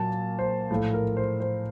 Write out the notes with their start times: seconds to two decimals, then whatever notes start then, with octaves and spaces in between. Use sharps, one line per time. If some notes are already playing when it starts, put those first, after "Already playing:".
Already playing: A#2 F#3 A#3 A5
0.39 C5
0.71 A2 F3 A3
0.94 A#4
1.17 C5
1.40 C5